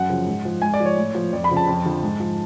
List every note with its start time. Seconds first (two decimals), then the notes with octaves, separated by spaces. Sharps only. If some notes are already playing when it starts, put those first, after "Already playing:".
Already playing: F#2 F#5
0.09 C#3 F3
0.26 G#2
0.45 F3
0.62 G#2 G#5
0.74 D5
0.80 F3
0.86 C#5
0.97 A2
1.15 F3
1.33 F2 D5
1.44 B5
1.50 C#3 F3
1.57 A5
1.67 F2
1.85 D3 F3
2.03 G#2
2.20 F3